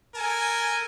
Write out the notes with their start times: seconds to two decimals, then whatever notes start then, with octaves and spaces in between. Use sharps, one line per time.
0.15 A4 A#4 G#5